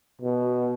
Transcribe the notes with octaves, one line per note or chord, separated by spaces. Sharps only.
B2